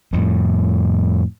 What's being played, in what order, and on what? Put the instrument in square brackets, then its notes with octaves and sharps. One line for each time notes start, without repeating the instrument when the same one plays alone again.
[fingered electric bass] F2 A2